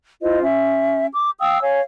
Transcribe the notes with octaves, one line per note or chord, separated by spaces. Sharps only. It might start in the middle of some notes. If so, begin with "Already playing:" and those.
E4 F4 C5 D#5
C#4 E5
D6
F5 G5 D#6 E6
C#5 F5 G#5